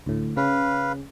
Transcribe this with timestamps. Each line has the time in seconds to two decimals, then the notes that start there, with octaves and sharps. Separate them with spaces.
0.06 D2 A2
0.37 C#3 C#4 B4 F5